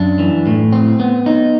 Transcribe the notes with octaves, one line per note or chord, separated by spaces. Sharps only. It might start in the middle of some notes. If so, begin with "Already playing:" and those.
Already playing: F#2 D4
E3
A2
C4
B3
D#4